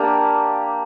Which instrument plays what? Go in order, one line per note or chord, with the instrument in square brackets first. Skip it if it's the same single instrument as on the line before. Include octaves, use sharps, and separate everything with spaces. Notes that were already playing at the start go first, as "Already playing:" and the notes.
Already playing: [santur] A#3 D4 G4